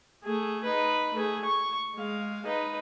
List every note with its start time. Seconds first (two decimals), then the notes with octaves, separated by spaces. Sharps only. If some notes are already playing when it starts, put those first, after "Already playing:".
0.24 A3 G#4
0.64 D#4 B4
1.14 A3 G#4
1.45 C#6
1.95 G#3 F5
2.46 D#4 B4